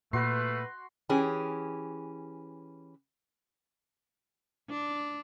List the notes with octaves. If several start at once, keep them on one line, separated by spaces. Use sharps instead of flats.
A#2 A3 F#4 B4 C6
E3 C#4 G4 G#4
D4